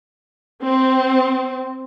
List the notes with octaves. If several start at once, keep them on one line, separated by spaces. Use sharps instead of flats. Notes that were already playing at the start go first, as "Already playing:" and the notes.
C4